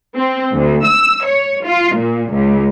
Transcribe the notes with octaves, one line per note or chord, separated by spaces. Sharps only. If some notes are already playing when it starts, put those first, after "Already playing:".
C4
D2
E6
C#5
F4
A#2
C#2